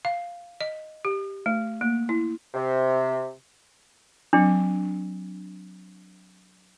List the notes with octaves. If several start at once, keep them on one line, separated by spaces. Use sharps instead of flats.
F5
D#5
G4
A3
A#3
E4
C3
F#3 C4 D4